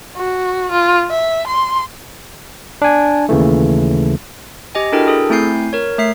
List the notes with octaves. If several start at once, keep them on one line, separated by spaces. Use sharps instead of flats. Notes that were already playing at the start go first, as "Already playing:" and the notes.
F#4
F4
E5
C6
D4 G#5
D#2 C#3 E3 A3
G4 D#5 G#5
D4 E4 F#4 A4 A#4 G5
G#4 A4
A3 C4 E4 G#5 G6 C7
A#4 C#5
A3 E5 C7